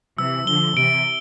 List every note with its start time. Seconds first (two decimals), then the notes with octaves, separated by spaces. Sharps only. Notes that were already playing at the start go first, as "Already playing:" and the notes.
0.18 C3 E3 E6
0.47 D3 F3 G7
0.76 C3 E3 D7